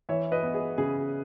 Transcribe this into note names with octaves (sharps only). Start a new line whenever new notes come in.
E3 C#5 E5
B4 D#5
B3
G#4
C#3 G#4